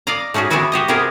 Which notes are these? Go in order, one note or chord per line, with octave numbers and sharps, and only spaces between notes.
D5 D#5 F5 A#5
A3 C#4 D#4 F#4 G#4
E3 B3 C4 E4 F#4 B4
F#4 G4 D#5
C3 B3 G4 G#4 A#4